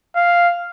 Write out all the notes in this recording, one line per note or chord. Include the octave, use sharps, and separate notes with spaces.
F5